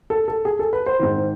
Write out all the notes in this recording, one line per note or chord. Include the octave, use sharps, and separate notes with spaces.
A4
A4
G#4
A4
B4
C5
G#2 D#3